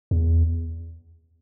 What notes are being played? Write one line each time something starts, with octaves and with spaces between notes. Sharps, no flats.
E2